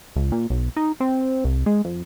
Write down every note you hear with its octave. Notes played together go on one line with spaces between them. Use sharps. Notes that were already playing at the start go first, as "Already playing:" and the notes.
C#2
A#2
B1
D#4
C4
C2
G#3
F2